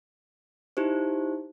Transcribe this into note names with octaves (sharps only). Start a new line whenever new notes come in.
D#4 E4 G4 C5